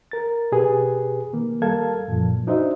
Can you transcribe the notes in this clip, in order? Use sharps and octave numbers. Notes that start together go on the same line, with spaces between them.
A#4 A6
B2 G4 G#4 B4
D#3 A#3
G3 A4 A#4 F5 A5 G#6
F#2 A#2 F3
D4 D#4 F#4 C5 D#5 E5